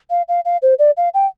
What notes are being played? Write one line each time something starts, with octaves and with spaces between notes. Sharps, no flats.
F5
F5
F5
C5
D5
F5
G5